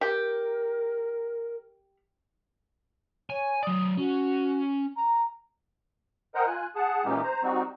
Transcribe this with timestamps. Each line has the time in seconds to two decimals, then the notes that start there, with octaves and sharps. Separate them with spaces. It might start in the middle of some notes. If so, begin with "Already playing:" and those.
0.01 G4 A#4
3.30 C#5 G#5
3.63 F#3 D5 D#6
3.97 C#4 F#4
4.96 A#5
6.35 A#4 C5 D#5 F#5 G5 A#5
6.47 F4 G#5 F#6
6.76 G#4 F#5 A5
7.05 A#2 E3 G#3 C#4 D#4 G4
7.23 C5 A#5
7.43 G3 C4 D#4 F#4